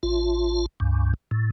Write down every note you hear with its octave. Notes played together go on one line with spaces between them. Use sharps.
A1 F4
C#2 G2
A2